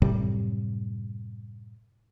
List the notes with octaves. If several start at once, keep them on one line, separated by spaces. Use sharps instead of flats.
F#2 A2 C3 G3